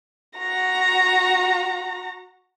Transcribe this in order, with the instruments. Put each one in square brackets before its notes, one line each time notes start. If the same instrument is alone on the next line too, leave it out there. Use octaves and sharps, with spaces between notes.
[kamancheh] F#4 A#5